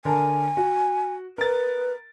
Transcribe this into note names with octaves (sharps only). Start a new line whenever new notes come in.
D3 A#4 G#5 A5
F#4
A#4 B4 A6